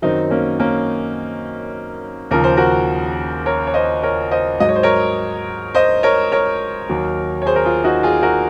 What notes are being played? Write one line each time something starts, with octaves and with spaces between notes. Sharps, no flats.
F#2 D#3 F#3 C4 D#4
A#3 C#4
A#3 C#4
D#2 C#3 F3 A#4
C5
F#4 A#4
A#4 C#5
C#5
C5 D#5
A#4 C#5
C5 D#5
G#2 F#3 D#5
C#5
C5
A#4 C#5
C5 D#5
A#4 C#5
A#4 C#5
D#2 D#3 F#3
C#5
G#4 C5
A#4
F4 G#4
D#4 F#4
F4 G#4
F#4 A#4